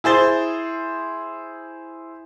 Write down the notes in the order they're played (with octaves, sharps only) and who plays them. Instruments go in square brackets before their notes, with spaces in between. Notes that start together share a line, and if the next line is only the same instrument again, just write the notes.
[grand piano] E4 G#4 C5 A6 G7